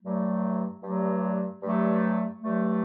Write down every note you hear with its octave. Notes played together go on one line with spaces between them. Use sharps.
G2 F#3 A3
G2 F#3 A3
G2 F#3 A3
G2 F#3 A3